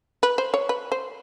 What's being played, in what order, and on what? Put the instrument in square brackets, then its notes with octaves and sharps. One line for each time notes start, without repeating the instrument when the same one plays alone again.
[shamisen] B4
C5
C#5
B4
C5